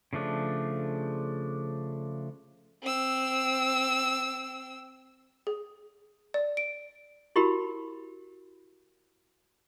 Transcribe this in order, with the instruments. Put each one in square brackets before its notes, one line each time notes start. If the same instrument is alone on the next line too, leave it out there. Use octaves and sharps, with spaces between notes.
[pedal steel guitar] C#3 F3 A3 D4
[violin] C4 E6
[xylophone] G#4
D5
D7
[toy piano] E4 F#4 G4 A#4 B5